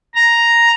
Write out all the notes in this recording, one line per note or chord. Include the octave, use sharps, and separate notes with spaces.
A#5